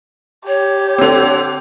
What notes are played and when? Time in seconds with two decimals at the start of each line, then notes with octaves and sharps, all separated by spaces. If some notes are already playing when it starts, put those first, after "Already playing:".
0.47 G4 C#5
0.98 D3 C4